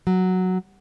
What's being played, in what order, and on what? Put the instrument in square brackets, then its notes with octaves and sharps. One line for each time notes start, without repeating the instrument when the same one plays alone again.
[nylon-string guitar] F#3